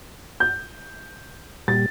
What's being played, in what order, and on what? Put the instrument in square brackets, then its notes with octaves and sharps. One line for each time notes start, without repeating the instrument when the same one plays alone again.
[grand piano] G6
[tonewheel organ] A#2 G3 [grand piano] A6